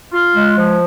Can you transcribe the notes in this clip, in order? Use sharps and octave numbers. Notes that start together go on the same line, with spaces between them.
F4
G#3
F3